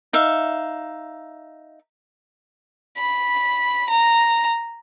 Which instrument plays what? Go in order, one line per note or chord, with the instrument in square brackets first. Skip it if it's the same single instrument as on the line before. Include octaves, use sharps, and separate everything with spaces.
[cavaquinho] D#4 E5 F5
[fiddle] B5
A#5